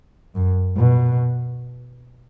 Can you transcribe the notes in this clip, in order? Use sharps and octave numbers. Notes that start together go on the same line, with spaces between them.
F#2
B2